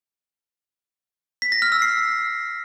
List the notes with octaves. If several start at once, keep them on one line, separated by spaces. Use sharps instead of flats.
B6
A#6
F6
E6
C7